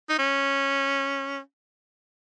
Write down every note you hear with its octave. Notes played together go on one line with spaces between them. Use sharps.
D#4
C#4